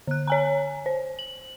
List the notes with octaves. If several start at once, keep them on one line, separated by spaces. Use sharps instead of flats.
D3 F#6
C#5 G#5 A#5
C5
F#7